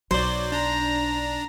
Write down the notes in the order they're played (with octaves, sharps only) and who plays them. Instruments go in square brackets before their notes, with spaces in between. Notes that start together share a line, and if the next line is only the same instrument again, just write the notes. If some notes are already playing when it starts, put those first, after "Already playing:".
[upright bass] B1 [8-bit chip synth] F#3 D5 [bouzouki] C5
[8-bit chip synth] D4 [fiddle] A#5